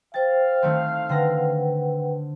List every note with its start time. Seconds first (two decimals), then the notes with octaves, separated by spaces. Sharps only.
0.14 C5 F5 G5 A6
0.63 D#3 A3 C4
1.09 D3 B4 F#5 G5 A#6